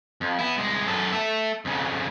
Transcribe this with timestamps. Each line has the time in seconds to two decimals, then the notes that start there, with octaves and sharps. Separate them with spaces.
0.21 F2
0.39 B3 E4
0.57 C2 G#3
0.86 F#2 A4
1.13 A3 E5
1.65 F2 C#3